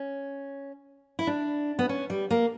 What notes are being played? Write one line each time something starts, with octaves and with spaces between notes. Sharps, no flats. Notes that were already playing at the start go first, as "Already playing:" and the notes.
Already playing: C#4
E4
D4
B3
C#4
G3
A#3